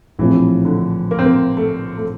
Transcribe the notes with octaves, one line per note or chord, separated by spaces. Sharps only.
A#1 A2 E3 F3 C4 E4
D3
A#3
C4
A#3
A3
A3